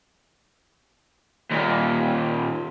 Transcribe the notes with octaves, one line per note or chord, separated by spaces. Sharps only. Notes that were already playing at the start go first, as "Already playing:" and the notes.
D#2 A#2